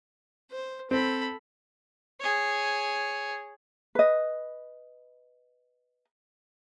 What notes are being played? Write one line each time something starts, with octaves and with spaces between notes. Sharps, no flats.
C5
C4 A4 B5
G#4 C#5
B4 D#5